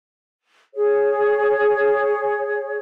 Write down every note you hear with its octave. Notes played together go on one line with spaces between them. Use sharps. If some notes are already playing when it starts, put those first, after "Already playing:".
G#4 C#5